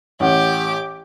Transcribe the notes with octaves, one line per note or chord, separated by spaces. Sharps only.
A1 G4 F#5 D6